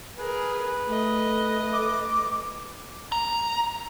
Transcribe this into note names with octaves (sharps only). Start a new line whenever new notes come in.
G#4 A#4 B4
A3 D#5
D6
A#5